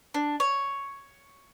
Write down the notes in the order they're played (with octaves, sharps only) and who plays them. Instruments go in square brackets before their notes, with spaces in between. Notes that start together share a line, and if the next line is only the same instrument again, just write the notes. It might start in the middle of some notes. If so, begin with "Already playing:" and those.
[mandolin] D4
C#5